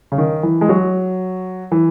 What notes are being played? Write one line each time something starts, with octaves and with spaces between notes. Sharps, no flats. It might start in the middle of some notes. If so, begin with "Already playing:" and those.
C#3
D#3
E3
G#3
F#3
E3